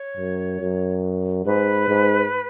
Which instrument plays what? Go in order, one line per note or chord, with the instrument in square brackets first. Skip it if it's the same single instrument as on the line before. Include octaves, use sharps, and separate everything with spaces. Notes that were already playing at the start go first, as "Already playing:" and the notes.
Already playing: [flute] C#5
[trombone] F#2
F#2
[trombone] G#2 [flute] B4
[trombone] G#2